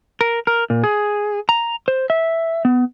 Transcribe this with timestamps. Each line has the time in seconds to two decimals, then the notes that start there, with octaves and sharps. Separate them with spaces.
0.21 A#4
0.47 A#4
0.70 A#2
0.84 G#4
1.49 A#5
1.88 C5
2.10 E5
2.65 B3